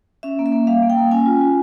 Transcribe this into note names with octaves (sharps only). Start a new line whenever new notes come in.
C#4 E5
A#3
E5
A#3
G3 F5
A#3
G5
A#3
C#4 G#5
F4
F4